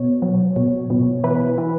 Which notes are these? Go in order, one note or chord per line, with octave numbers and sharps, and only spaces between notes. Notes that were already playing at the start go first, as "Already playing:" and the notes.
Already playing: B2 C#5
F#3
B2
B2
E3 B4
E3